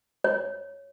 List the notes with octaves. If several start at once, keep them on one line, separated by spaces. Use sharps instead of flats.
C#5